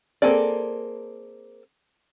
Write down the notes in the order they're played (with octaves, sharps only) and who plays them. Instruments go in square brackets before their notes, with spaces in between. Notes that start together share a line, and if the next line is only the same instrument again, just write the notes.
[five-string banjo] A#3 C4 G#4 A4 D5